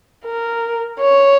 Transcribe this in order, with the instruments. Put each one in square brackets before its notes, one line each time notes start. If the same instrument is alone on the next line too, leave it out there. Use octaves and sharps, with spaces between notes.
[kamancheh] A#4
C#5